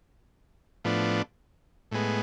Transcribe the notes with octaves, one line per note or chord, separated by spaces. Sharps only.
A2 F3 B3 D4
A2 G#3 B3